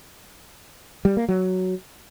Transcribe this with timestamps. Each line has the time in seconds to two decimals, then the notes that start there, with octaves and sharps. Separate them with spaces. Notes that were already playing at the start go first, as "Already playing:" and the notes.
1.05 G3
1.17 A#3
1.29 F#3